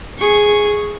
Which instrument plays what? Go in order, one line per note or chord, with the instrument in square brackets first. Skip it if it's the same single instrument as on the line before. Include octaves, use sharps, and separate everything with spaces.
[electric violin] G#4 C#6